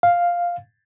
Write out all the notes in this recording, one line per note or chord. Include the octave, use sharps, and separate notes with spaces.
F5